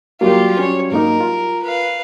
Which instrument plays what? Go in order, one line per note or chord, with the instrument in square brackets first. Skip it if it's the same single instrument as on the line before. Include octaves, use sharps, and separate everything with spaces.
[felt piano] F#3 G3 [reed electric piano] A#3 [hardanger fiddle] F4 G4
[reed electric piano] C#4 [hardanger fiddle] C#5
[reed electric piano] G#2 A#3 D#4 [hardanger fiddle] A#4
[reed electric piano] F4
[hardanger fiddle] B4 F5